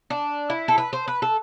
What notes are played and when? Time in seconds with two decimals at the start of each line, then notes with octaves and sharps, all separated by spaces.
0.10 D4
0.50 E4
0.68 A4
0.78 B4
0.93 C5
1.08 B4
1.22 A4